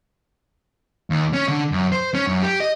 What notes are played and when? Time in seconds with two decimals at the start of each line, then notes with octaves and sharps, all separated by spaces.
1.10 D#2
1.33 C#4
1.48 D3
1.72 F#2
1.92 C5
2.14 C#4
2.27 F#2
2.42 G4
2.60 D#5